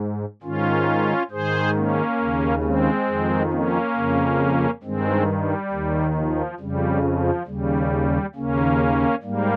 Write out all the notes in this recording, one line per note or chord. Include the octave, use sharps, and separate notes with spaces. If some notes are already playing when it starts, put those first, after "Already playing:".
Already playing: G#2
G#2 D#3 C#4 F4
G#2 D#3 G#4 C5
A#3 C#4
D#2 C#3
G#3 C4
F2 D#3
A#3 C#4
F2 C#3
G2 D#3 G#3 C4
G3
D#2 D#3
F3
F2 C#3 G3
F3
D#2 C#3 G3
D#2 C#3 A#3 C#4
G#2 G3 A#3